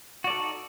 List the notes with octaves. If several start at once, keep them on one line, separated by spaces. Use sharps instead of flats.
D#4 F#4 A4 D5